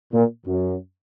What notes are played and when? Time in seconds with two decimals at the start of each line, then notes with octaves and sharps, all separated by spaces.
0.13 A#2
0.46 F#2